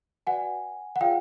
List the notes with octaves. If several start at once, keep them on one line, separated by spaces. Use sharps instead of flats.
F#4 B4 D5 F#5 G#5
F#5
F4 G#4 C#5 F5 G5